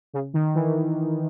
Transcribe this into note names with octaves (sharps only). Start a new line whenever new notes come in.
C#3
D#3
E3